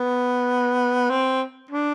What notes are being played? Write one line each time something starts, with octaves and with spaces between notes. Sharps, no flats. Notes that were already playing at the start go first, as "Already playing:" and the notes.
Already playing: B3
C4
D4